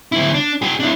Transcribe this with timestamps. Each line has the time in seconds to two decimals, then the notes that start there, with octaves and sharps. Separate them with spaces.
0.12 D2 E4
0.34 D4
0.62 F#4 G#4
0.80 D4 E4